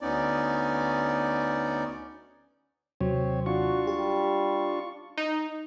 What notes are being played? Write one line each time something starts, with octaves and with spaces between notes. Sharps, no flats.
D2 B3 C#4 D#4 D5
D#2 C3 F#3 C4 C#5
D4 F4 F#4 C#6
G3 G4
D#4